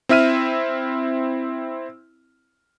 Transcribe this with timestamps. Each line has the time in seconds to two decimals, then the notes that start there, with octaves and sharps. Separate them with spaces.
0.09 C4 E4 E5 F6 D#7